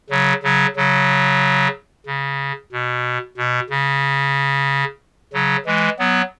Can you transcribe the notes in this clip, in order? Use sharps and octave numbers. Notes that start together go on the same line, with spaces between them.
C#3 F#3
C#3 F#3
C#3 F#3
C#3
B2
B2
C#3
C#3 F#3
E3 G#3
F#3 B3